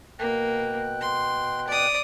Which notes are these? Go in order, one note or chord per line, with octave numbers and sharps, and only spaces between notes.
B2 A#3 G5 F#6
C6
D5 D#6